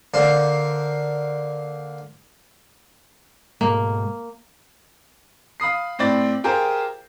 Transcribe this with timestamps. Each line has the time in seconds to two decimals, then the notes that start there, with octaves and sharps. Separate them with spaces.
0.14 D3 A#3 C5
3.61 G#2 B2 G#3 A#3
5.60 F5 B5 D#6 C7
5.99 A2 C4 D5 A6
6.44 F4 G4 G#4 A#4 C5